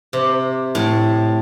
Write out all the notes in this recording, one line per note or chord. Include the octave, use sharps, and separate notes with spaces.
C3
A2